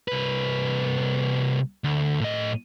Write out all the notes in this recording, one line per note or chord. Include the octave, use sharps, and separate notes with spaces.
C2 B4
D2
A2 D#5